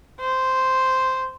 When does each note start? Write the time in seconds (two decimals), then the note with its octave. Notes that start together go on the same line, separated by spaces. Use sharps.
0.20 C5